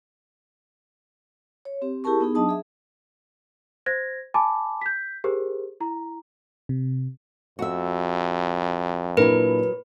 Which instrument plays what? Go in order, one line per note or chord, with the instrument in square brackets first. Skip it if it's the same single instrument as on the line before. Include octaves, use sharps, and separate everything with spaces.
[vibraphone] C#5
C4 G4
E4 G4 G#4 A#4 A5 C#6
B3 D#4 G#4
F#3 D4 D#5 A5 D#6
G#4 E5
[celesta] C5 G#6 A#6
G#5 A5 B5 D6
G6 B6
G4 G#4 A#4 C5
E4 A#5
[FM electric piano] C3
[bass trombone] F2 [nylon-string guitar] F#4 E5
[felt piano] A#2 D4 E4 [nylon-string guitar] F#3 A#4 [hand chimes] B4